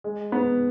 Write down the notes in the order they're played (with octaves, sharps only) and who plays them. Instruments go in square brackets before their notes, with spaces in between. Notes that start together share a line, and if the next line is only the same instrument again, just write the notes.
[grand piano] G#3
B3